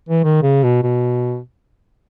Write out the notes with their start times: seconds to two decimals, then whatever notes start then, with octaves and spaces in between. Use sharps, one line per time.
0.09 E3
0.24 D#3
0.43 C#3
0.64 B2
0.83 B2